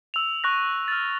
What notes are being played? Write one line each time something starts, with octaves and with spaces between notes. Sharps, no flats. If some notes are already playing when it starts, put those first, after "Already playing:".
E6 F7
C#6 F#6 A#6
F6 A6